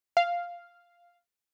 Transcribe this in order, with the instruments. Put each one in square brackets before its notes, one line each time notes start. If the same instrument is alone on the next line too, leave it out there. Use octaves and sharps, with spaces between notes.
[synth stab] F5